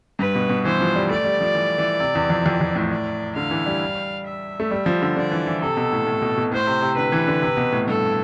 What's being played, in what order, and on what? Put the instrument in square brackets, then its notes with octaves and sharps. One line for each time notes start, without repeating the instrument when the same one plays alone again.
[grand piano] G2 [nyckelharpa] B4
[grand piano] B2
B2
[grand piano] E3 [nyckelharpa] C5
[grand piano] F3
G3
[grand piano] A3 [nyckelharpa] D5
[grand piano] G3
F3
E3
E3
C3
E2
F2
F2
F2
A2
[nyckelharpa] D5
[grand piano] D3 [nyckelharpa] F5
[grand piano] E3
G3
[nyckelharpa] E5
[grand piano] A3
G3
F3
D3
[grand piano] D3 [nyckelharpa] D5
[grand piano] E3
E3
[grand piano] C3 [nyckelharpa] A4
[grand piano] B2
A2
A2
B2
B2
[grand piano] A2 [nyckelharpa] C5
[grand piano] C3
C3
[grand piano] D3 [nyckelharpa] B4
[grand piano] E3
D3
C3
B2
A2
[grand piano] G2 [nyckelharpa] A4